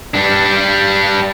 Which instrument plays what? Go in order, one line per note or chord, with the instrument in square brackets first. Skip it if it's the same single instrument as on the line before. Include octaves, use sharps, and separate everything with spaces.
[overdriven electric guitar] G3 D4